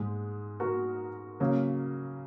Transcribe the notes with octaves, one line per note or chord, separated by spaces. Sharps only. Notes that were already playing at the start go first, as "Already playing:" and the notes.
Already playing: G#2 G#3
F#4 A#4
C#3 F#3 A#3